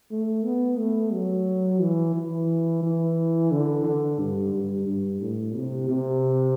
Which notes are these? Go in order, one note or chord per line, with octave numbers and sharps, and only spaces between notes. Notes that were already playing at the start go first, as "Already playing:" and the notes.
A3
B3
A3
F#3
E3
E3
E3
D3
D3
G2
G2
G2
A2
C3
C3